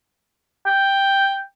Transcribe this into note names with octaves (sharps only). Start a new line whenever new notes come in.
G5